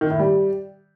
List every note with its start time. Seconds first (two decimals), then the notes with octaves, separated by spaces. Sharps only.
0.01 D#3
0.10 A2
0.19 G3